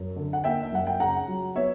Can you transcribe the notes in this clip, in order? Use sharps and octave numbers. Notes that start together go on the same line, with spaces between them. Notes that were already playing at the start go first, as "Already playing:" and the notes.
Already playing: F#2
D3
F#5
A#3 E5 G5
E5
F#2 F#5
G5
C#3 F#5 A#5
F#3
B3 C#5 E5